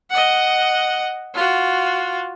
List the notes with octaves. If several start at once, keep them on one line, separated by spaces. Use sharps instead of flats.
D#5 F#5
F4 F#4